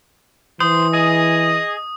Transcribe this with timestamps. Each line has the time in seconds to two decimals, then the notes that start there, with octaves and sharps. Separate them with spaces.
0.60 E3 C5 D#6
0.93 G#4 D#5